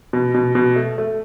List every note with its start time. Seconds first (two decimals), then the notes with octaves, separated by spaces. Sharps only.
0.13 B2
0.34 B2
0.55 B2
0.76 A3
0.98 A3